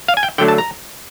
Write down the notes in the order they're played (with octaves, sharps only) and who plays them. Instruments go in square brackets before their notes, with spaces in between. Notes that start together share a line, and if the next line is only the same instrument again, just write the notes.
[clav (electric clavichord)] F5
G#5
G5
D3 F#3 A3 D4 G5
A5
A#5